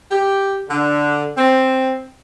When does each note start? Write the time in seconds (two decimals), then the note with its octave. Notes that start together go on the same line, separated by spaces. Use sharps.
0.11 G4
0.69 D3
1.37 C4